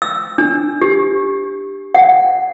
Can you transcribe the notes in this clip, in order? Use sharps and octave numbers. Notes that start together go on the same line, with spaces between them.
E6
D4
G4
F#5